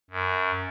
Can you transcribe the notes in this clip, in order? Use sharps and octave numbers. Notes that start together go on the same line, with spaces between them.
F#2